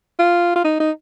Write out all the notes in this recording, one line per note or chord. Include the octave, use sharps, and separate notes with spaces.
F4
F4
D#4
D#4